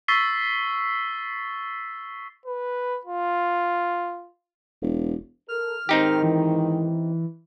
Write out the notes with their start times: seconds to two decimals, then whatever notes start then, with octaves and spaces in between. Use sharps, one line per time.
0.08 C#6 E6 A6 B6 C7 G7
2.46 B4
3.05 F4
4.82 E1
5.48 A4 A#4 F6
5.89 G#2 D#3 C4 D#4 G4
6.23 E3